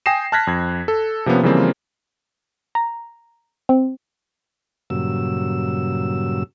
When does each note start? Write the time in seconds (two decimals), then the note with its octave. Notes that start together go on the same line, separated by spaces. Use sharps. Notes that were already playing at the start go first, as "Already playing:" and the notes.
0.06 G5 G#5 D#6 A#6 C7 E7
0.32 A5 F6 F#6 G#6 A#6 B6
0.47 F2 G#6
0.88 A4
1.26 C3 F3 A#3 B3 C#4
1.43 C#3 E3 F3 G3 A#3 C4
2.75 A#5
3.69 C4
4.90 G2 A#2 C#3 F#3 E6